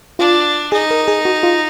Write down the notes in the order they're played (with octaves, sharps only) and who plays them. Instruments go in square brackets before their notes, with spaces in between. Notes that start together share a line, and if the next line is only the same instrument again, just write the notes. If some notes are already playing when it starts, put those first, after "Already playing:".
[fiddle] D4 [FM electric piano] F4
[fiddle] D#4 [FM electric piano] G#4
[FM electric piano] A#4
G#4
F#4
F4